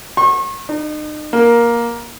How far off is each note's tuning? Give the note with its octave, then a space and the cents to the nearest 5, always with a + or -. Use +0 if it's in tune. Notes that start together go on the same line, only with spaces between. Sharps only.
C#6 -40
D#4 -40
A#3 +10